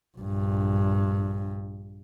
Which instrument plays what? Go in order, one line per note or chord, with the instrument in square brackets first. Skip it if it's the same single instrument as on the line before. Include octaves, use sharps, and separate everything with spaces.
[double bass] A#1 G2